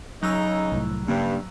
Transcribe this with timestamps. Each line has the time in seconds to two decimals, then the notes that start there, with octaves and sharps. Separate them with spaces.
0.23 C#3 F#3 D#4 A#5 E6
0.72 C2 A2
1.08 G2 C#3 A#3